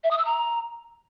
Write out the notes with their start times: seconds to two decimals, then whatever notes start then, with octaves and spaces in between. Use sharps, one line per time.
0.04 E5
0.11 D#6
0.18 E6
0.25 A#5